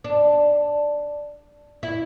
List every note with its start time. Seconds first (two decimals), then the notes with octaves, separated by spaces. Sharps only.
0.04 D4
1.83 E4